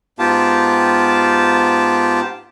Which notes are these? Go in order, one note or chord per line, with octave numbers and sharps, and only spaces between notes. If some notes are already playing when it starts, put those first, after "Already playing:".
G#2 B3 F4 G4 A5